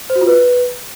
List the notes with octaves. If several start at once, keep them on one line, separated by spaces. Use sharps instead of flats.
C5
F#4
F4
B4